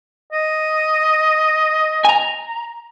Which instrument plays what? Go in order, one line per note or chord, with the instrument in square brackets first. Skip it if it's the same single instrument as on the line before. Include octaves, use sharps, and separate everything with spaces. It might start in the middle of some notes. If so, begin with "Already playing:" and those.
[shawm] D#5
[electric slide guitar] G#5 A#5